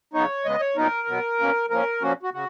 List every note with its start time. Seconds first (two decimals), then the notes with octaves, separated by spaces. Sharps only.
0.13 C#3 F#3 B3 D#4 C#5
0.45 C#3 G#3 B3 D#5
0.60 C#5
0.76 A#2 F#3 B3 D#4 A#4
1.08 B2 F#3 B3
1.39 B2 A#3 C#4
1.70 F3 A#3 C#4 A#4
2.02 A#2 F3 A#3 C#4 F#4
2.23 F#4
2.34 C#3 F#4